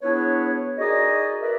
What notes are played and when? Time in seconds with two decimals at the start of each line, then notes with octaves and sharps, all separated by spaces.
0.02 B3 D4 E4 G#4 B4 C#5
0.78 D#4 F#4 G#4 A#4 D5 D#5
1.41 A#4 B4 D5 E5